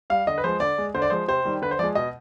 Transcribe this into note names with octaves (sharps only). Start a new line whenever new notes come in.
G3 F5
D3 D#5
B4
F3 G#3 C5
D3 D5
G#3
D3 C5
D5
F3 G#3 C5
C3 C5
D#3 G3
D3 B4
C5
F3 G#3 D5
B2 D#5